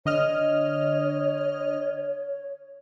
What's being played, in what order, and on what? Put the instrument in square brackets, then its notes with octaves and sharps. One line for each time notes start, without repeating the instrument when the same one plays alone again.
[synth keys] D3 D#5 F6 [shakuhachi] C#5